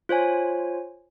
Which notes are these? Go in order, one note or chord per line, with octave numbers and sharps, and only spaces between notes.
F4 C5 C#5 G#5